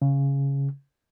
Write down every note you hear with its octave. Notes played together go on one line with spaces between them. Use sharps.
C#3